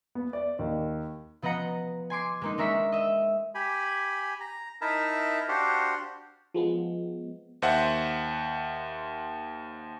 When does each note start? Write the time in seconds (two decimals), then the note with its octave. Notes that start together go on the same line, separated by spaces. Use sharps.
0.15 B3
0.33 D5
0.59 D#2
1.42 F3 B3 D#5 F#5 A#5 C#7
2.10 G#5 C6 D6 C7
2.41 G#3 A#3 D#4
2.58 G#3 D4 A#4 E5 C#6 B6
2.92 D#5 E5
3.55 G4 G#5 B5
4.40 A#5
4.81 D#4 E4 A#4 E5 A5 A#5
5.48 D4 F#4 G4 C5 F5 F#5
6.54 F3 G#3 B3
7.62 D#2 C5 E5 F#5